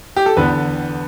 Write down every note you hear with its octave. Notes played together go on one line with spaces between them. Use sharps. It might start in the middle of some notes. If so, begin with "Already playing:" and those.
G4
A4
E2 D3 B3 B4